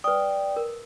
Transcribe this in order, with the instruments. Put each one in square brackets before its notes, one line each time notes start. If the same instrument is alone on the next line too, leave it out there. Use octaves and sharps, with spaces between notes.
[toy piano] B4 D#6 [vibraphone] D5 G5
[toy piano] A#4